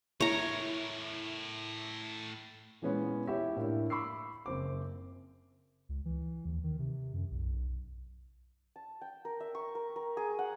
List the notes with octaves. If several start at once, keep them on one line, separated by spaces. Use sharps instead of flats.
A2 E4 A#4 C#5 A#5
A#2 E3 G#3 B3 C#4
E4 G4 C#5 E5
A2 A#3 D4 E4
B5 C#6 D6 E6 C7
F#1 C4 D6
C#2
E3
D#2
D#3
C3
F#2
B1
A5
G5
A#4
E5
C#6
A#4
A#4
G#4
F#5